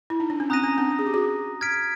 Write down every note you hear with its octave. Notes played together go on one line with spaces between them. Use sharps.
E4
D#4
D4
C#4
C4 A#5 D#6 F#6 A#6 D#7
C#4
C4 D4
G#4
G4
F#4 G#4
F6 G#6 B6 D7